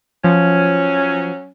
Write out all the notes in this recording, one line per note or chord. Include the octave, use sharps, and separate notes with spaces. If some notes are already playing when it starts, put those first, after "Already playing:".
F3 F#3 C#4